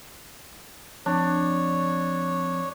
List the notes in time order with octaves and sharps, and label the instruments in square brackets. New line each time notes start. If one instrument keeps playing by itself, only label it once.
[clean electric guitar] F2 [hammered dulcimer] D4 [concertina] C#5